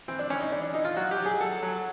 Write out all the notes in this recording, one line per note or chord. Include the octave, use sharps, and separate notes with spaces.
E3 C4
D4
E3 C#4
D#4
E3 D4
D4
E3 D#4
F4
F#3 F#4
G4
F#3
G#4
F#3 A4
F#3